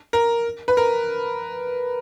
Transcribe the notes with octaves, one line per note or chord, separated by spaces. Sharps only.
A#4
B4
A#4